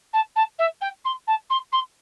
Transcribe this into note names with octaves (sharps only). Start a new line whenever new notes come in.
A5
A5
E5
G5
C6
A5
C6
C6